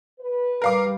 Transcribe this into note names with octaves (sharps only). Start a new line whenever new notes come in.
B4
G3 A#4 F5 D6